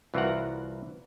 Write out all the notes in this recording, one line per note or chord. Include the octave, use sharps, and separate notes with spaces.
C2 E3 F4 F#4 A#4 F#5